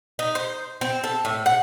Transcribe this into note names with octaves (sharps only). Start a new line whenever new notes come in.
D#4
C5
C4
A4
A2
F#5